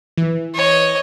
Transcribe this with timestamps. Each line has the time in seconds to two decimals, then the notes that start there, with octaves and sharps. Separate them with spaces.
0.17 E3
0.55 C#5 D#5